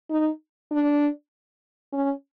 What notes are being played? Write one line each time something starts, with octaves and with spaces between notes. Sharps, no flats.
D#4
D4
C#4